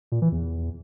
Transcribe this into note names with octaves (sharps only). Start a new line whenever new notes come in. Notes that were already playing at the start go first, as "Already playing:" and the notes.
A#2
E3
E2